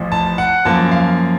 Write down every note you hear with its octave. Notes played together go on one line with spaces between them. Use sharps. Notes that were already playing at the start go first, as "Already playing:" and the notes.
Already playing: A1 A2 F3
A5
F#5
F#2 F3 A#3 A5
F5